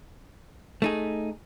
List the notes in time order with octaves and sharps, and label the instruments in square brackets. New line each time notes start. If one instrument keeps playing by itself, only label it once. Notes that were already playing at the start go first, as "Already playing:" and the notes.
[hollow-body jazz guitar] A3 D#4 G#4